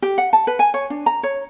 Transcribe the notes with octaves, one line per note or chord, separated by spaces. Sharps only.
G4
F#5
A5
B4
G#5
C#5
D4
A#5
C#5